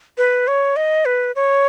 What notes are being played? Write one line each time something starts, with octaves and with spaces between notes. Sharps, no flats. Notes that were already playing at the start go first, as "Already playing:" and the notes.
B4
C#5
D#5
B4
C#5